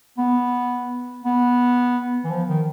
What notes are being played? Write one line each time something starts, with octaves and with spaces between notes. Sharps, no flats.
B3
B3
E3
F3
D#3